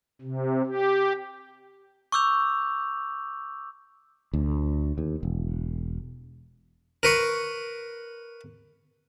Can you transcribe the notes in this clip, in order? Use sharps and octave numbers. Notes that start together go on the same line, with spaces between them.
C3
G4
C#6 D6 E6 G6 F7
D2
D#2
E1
A#4 B4 C#6